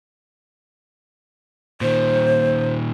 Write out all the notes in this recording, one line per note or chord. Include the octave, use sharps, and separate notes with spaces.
A#2 D#3 C5